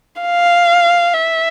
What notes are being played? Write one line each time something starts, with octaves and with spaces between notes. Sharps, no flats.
F5
E5